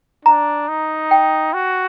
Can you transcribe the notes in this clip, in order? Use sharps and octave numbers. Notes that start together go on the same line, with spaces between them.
D4 A#5
D#4
G5
F#4